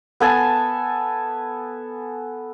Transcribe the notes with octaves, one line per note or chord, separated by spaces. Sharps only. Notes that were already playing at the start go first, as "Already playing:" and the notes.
B3 A4 G#5 A5